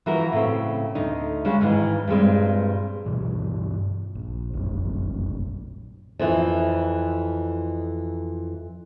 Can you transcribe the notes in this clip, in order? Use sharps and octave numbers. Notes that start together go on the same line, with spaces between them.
E3 F3 F#4 A#4
A2 C#3 C4
D2 D#4
C#3 G#3 F#4
G#2 D#3 E3
G2 A#2 G#3 C4
G2 B2 E3
A#1
F1 A#1 F#2
F2 E3